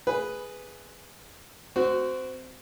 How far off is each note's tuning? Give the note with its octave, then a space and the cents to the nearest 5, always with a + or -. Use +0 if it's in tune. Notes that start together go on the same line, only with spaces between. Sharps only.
G#4 +0 B4 +0
C4 -20 F#4 +5